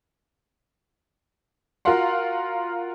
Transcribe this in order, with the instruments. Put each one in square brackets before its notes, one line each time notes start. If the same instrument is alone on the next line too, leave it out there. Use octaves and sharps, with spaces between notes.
[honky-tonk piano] F4 F#4 A#4 F5 F#5 C6